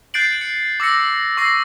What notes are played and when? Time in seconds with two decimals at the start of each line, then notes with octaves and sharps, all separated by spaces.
0.14 F#6 G6 A6 C7 D7 F#7
0.41 C#7
0.80 D6 E6 A#6 C#7
1.37 C#6 E6 A#6 C7